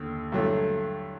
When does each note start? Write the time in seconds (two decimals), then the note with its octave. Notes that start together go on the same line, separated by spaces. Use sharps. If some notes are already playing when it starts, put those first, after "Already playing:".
Already playing: D#2 D3
0.32 G2 D3 F#3 A3